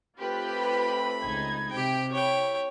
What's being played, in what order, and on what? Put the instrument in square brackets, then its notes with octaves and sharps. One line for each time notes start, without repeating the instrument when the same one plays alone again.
[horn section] A3 C4 B5 [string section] F4 G4 B4
[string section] C#2 D#4 G#6
[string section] C3 [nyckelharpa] G4 G5
[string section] E4 [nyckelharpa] C#5 G5